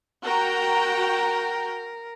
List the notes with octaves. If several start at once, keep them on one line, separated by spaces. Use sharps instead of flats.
F#4 A#4 G5 A#5